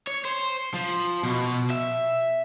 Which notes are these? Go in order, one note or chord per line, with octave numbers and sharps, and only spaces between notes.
C#5
C5
F3
B2
E5